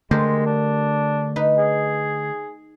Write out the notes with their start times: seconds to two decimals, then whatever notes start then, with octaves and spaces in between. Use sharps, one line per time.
0.11 D3 G#3 A3 G4 A#4 C5
0.46 D4
1.36 D#4 B4
1.58 G#4